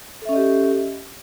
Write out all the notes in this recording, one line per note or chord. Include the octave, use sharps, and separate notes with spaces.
C#4 G4 A4 D#5 E5